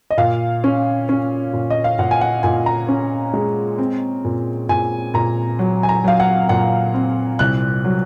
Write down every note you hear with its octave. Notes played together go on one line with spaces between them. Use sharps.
D#5
A#2 F5
C#4
C#4
A#2
D#5
F5
A#2 F#5
G#5
F#5
A#2 G#5
A#5
C#4
G#3
C4
A#2
A#2 G#5
A#2 A#5
F#3
G#5
A#5
F#3 F5
F#5
A#2 F#5
C4
C2 F#6
F#3